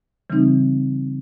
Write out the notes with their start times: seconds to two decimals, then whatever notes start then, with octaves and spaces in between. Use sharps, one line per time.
0.30 C#3 E3 G3 C4 D#4